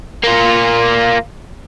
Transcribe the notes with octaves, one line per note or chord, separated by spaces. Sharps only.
A#3 F4